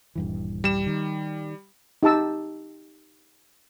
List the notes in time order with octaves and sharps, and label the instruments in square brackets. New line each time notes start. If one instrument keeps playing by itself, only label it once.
[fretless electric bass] D#1 G2 E3
[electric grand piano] G3 E7
[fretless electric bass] D#3
[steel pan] D#4 G4 A5 E6